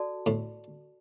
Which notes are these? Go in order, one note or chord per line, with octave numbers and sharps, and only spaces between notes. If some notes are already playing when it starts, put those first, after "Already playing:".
Already playing: F#4 A4 D5 A5
A2